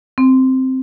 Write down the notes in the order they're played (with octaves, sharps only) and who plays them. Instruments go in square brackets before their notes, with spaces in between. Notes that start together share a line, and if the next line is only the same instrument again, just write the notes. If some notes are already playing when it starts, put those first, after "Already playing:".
[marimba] C4